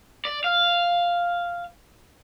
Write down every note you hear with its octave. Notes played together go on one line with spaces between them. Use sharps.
D5
F5